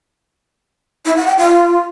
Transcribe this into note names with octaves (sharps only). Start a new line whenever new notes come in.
E4
F#5
G5
F4